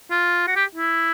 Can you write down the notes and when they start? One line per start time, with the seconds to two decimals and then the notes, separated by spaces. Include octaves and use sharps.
0.11 F4
0.48 F#4
0.56 G4
0.76 E4